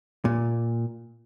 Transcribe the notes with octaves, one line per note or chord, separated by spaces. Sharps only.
A#2